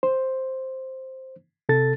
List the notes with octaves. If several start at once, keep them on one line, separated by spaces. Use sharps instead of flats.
C5
C3 A4 A6